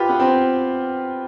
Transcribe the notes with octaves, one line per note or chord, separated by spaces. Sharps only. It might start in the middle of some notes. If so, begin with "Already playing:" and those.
Already playing: F4 G4 B4
B3
C4